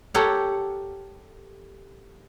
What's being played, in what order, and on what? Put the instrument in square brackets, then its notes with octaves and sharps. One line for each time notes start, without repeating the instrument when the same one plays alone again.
[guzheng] G4 A4 A#4 C#5 F#5